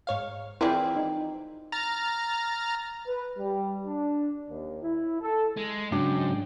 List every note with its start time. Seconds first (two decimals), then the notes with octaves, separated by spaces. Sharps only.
0.07 G#2 C#5 F5
0.61 E3 F3 C4 E4 G#4 D5
0.96 D#4
1.72 A#5 F6 A6
3.06 B4
3.37 G3
3.86 D4
4.48 D#2
4.82 E4
5.20 A4
5.57 G#3
5.92 G#2 C#3 F#3 D4 G5